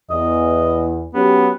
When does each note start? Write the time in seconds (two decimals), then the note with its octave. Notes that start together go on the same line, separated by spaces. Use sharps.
0.10 E2 D#5
1.14 F#3 B3 C#4 G4